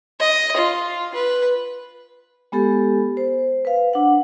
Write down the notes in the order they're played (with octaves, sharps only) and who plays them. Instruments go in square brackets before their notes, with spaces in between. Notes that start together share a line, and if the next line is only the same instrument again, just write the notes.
[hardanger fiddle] D#5
F4
B4
[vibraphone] G#3 B3 G4 A4
C5
B4 F5
D4 F#5